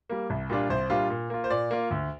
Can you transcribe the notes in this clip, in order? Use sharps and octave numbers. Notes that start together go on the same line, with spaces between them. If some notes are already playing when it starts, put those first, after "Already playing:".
G3 A#3
C2
A#2 G3 D4 F4
C2 C5
A#2 G3 D4 F4
A#2
A#3 F4
C5
A#2 D5
A#3 F4
D2